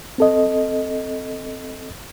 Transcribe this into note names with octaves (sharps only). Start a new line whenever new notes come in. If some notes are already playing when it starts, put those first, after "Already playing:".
C4 A4 D#5